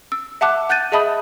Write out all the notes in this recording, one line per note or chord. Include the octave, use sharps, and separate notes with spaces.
E6
E5 F#5 A5 D6 F#6
F#5 F#6 G6 A6 D#7
G#4 D#5 E5 A5 B5 D#6